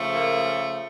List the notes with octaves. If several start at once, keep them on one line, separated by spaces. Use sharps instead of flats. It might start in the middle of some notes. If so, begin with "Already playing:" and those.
Already playing: C#3 F3 A3
A#3